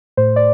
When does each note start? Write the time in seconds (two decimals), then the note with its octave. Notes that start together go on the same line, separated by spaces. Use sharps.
0.17 A2 C5
0.36 D5